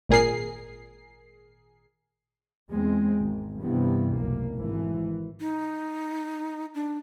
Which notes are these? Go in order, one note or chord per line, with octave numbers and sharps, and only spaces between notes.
G#1 A#2 G#4 A#4 C7
E2 G#3 C4
G#1
G2 C3 E3 B3
F1 B1 A#3
G#1 E3
D#4
D4